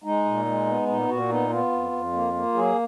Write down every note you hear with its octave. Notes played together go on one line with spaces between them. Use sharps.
G#3 D#4
A#2
G#3
B3
A#2 D#4
A#2 F#4
B3 D#4
B3 F4
F2
F2
A#3
A#3
F#3 G#4